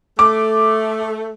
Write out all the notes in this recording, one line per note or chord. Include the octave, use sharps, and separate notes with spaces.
A3 D6